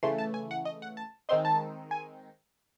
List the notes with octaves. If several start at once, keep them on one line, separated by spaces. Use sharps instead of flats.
C#3 E3 A3 C6
A5
G#5
F#5
D#5
F#5
A5
D#3 G#3 C4 D#4 C6
A5
G#5